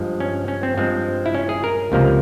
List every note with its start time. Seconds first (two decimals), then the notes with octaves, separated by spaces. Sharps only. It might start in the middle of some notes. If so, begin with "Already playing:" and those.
Already playing: G2 F3 G#3
0.20 C#4
0.48 C#4
0.63 C4
0.77 G2 F3 G#3 C4
1.26 E4
1.35 C#4
1.49 G#4
1.64 A#4
1.92 C#2 C3 F3 A#3